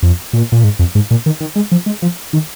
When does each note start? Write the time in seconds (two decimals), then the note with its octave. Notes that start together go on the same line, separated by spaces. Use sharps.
0.03 F2
0.33 A#2
0.52 A#2
0.64 G#2
0.79 F2
0.95 G#2
1.11 A#2
1.26 D#3
1.41 D#3
1.56 G#3
1.72 F3
1.86 G#3
2.02 F3
2.33 D#3